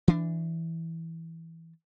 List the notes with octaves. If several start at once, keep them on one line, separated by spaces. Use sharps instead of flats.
E3 D4